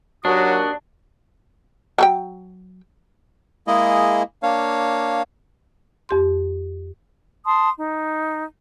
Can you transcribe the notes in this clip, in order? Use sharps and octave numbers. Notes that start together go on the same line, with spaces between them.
D#2 F#3 D4 F#4 D#6
F#3 A4 G5
G#3 A#3 E4 G#4 D#5
A#3 D4 C#5 F5
F2 G4 C6
A5 C6 D#6
D#4